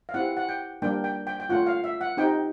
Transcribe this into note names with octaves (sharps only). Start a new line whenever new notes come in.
F5
C4 E4 G4 F#5
F#5
G5
G3 A#3 D4 G5
G5
G5
G5
A3 C#4 F4 F#5
F5
E5
F#5
C4 D#4 G4 G5